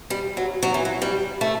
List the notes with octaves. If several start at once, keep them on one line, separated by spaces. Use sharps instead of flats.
G3
F#3
F#3
E3
F#3
G3
A3